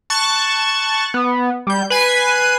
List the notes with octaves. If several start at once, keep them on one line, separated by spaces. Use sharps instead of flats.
A5 C#6 F#6 A6
B3
G3 G6
B4 G#5 C7 D#7